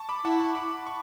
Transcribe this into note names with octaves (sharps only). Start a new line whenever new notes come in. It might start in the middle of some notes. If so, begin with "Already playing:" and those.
Already playing: A5 C#6
B5 D6
E4 F#5 A5
A5 C#6
B5 D6
C#6